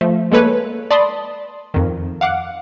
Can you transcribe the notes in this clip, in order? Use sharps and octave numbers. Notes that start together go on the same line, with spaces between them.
F3 A3
G#3 A#3 A4 B4 C#5
D5 A5 B5 C6 D#6
F2 D#3
F5 F#5 D6 F#6